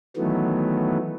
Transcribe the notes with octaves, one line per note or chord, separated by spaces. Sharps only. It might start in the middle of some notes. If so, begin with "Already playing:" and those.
D#3 E3 F#3 A3 B3